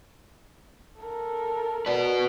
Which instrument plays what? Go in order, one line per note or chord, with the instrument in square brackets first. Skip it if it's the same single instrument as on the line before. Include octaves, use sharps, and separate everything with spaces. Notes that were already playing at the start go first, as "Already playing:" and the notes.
[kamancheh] A4 A#4
[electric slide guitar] F#4 B4 [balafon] D5